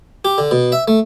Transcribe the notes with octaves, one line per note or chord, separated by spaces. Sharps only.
G4
D3
B2
E5
A3